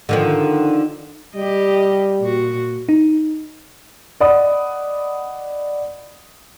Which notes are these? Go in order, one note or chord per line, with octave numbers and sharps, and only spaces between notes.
D3 D#3 F3
G3 G4 D#5
A#2 F#4
D#4
D5 D#5 F#5 B5 D#6